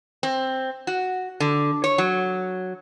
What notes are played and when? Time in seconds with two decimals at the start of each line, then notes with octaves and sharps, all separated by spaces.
0.23 C4
0.87 F#4
1.40 D3
1.84 C#5
1.98 F#3